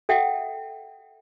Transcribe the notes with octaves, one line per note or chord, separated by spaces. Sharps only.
A4 E5 F#5 G5